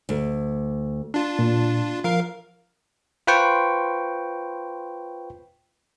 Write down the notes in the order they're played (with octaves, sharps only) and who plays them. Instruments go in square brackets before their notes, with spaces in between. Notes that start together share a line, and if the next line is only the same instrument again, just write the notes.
[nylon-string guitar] D2
[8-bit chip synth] D4 F4
[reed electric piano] A#2
[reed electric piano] F3 [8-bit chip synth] A#4 F5
[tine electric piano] F4 B4 C5 G5 C#6